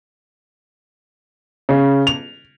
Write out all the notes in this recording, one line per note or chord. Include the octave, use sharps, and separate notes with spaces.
C#3
F7